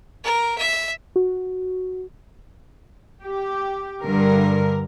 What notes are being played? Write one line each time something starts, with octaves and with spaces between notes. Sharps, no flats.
A#4
E5
F#4
G4
G2 D3 A#4